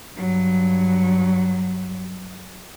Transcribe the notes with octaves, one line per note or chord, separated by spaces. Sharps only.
G2 F#3